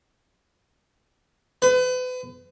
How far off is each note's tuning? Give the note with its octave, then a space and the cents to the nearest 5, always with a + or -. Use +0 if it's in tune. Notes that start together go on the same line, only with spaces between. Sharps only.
B4 +35